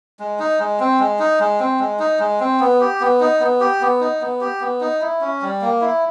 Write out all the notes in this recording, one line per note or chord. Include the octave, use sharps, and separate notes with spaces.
G#3
D#4
G#3
C4
G#3
D#4
G#3
C4
G#3
D#4
G#3
C4
B3
G4
B3
D#4
B3
G4
B3
D#4
B3
G4
B3
D#4
E4
C#4
G3
A#3
E4